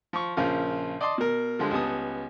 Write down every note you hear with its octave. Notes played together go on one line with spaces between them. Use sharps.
F3 C#6
A#1 C#3 F3 A#4 F5
D5 D#5 A5 C6
B2 A#4
D3 F3 G3 G#3
C#2 G3 B3 A5 D#6